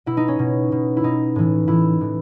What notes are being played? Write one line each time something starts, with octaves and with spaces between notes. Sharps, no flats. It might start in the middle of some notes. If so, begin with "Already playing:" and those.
B2 E4
D#4
C#4
B2
B2
E4
B2 D#4
A2 E3
A2 E3 E4
A2 E3